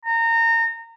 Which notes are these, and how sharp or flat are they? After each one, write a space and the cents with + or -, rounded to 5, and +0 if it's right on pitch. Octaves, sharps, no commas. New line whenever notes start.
A#5 -25